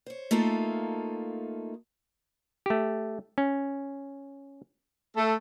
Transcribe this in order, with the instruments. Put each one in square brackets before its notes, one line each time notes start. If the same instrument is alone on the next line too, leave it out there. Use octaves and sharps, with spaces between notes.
[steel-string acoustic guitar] C5 C#5
A3 A#3 D#4 F4 A4
[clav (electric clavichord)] A3 G4
C#4
[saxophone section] A3 A4